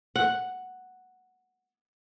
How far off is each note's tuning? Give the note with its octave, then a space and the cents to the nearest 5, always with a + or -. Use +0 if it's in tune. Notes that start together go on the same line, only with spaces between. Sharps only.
F#5 +0